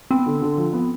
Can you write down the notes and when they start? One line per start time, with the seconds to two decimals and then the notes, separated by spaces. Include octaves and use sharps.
0.11 B3 C4
0.26 D3
0.42 D3
0.58 F3
0.73 B3